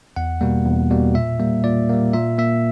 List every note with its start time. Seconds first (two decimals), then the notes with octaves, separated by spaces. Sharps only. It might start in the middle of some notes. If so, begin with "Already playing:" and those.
0.16 E2 F#5
0.41 B2 G3 A#3
0.65 E2
0.90 B2 G3 A#3
1.14 A#2 E5
1.40 G3 A#3
1.64 A#2 D5
1.89 G3 A#3
2.13 A#2 E5
2.38 A#3 E5